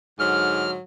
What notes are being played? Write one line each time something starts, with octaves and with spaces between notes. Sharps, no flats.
G#2 D3 F#3 F6